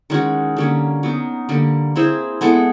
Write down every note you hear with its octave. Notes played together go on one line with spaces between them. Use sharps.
D#3 G#3 C#4 F#4
D3 G3 A#3 C#4
F#3 B3 D#4
D3 G3 A#3
C4 E4 G#4 C5
G#3 B3 E4 A4